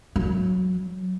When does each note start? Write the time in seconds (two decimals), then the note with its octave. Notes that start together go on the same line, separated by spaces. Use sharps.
0.16 F#3